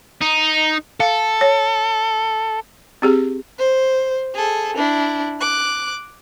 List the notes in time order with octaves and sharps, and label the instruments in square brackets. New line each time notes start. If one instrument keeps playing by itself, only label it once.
[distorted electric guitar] D#4
[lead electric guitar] A4 [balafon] F5
[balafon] C#5
C4 G4 G#4
[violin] C5
G#4 A4
D4 E4
D6 F#6